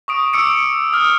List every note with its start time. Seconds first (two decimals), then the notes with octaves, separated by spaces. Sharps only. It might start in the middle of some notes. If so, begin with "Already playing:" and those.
0.08 C#6 D#6 D7
0.33 D6 E6 C#7 D7
0.93 D#6 F6